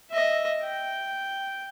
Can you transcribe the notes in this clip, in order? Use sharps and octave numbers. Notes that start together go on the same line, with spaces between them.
D#5 E5
G5